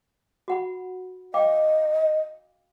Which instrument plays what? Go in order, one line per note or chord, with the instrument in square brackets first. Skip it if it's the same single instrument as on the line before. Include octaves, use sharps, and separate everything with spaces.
[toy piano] F#4 F#5 B5
[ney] D#5 [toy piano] F5 G5 D6